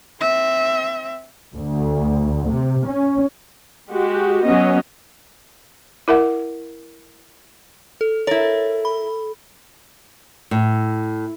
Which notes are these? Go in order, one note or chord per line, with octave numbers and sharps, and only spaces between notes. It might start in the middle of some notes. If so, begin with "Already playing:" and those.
C4 E5
D2
C3
C#4
G#3 F#4 G4
F#3 B3 C#4 D#5
E4 A#4 E5 F#5
A4
E4 A4 A#4 C#5
B5
A2